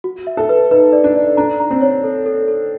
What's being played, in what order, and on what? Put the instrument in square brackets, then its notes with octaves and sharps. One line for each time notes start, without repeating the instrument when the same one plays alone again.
[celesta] F#4
E5
[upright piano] A4
[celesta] B4
[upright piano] D#4 [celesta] B4
[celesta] D5
[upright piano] D4
[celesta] D5
[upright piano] D4 [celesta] A#5
[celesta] A#5
[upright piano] C4
[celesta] C#5
A4
A4
A4